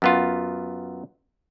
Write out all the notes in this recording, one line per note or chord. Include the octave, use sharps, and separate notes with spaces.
F#2 B3 F4